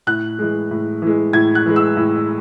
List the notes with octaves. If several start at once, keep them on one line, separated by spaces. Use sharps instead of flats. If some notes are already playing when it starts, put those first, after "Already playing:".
A2 F#6
E3 G#3
A2
E3 G#3
A2 G#6
F#6
E3 G#3
E6
A2